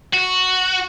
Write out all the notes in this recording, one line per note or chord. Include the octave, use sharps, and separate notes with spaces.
F#4